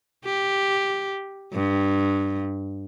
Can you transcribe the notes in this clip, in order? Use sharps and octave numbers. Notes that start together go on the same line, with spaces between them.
G4
G2